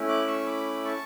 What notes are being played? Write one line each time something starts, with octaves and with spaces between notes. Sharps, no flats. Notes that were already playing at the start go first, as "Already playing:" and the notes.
Already playing: A3 C#4 E4
D6 F#6
C#6 E6
B5 D6
A5 C#6